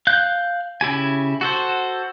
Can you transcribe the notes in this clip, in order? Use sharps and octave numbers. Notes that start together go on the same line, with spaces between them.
F5 F#6 G6
C#3 E4 G4 G#5
F#4 A4 C5